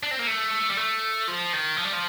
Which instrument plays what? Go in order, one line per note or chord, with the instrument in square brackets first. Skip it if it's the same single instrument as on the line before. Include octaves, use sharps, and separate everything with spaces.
[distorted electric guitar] D4
C4
A#3
A3
G3
A3
F3
D#3
F3
G3
F3